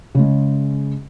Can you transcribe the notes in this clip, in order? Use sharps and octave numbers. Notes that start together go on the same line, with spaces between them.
C#3 G#3